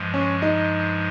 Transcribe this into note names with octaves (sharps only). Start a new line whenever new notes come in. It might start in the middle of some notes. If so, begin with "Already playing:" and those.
Already playing: G2 F3 G#3
C#4
D#4